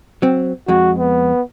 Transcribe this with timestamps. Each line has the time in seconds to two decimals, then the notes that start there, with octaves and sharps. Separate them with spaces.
0.22 F#3 C4
0.68 F2 G#3 F#4
0.99 B3